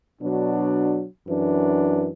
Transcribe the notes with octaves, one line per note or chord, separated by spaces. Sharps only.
B2 F#3 D4
F#2 E3 D4